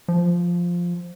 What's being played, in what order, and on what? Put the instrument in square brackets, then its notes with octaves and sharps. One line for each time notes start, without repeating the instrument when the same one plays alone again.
[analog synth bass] F3